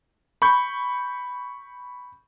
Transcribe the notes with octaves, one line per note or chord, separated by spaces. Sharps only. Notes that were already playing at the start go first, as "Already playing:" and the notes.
B5 C#6 G6